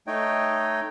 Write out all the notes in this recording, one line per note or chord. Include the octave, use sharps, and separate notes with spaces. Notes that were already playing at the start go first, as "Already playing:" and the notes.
A3 D#4 C#5 D#5 G5